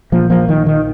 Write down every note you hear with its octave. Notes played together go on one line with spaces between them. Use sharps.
A#1 A#2 F3 A#3
F3 A#3
D#3
D#3